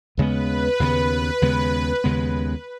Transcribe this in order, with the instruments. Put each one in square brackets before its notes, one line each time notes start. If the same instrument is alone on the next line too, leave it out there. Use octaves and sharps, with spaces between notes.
[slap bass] D#2 C#3 G#3 B3 [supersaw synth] B4
[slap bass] D#2 C#3 G#3 B3
D#2 C#3 G#3 B3
D#2 C#3 G#3 B3